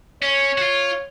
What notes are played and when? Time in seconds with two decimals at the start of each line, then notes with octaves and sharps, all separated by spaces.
0.22 C#4 C#5
0.58 F#4
0.62 F4